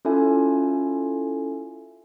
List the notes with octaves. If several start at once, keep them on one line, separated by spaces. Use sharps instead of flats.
C#4 E4 F4 A4 E5 G#5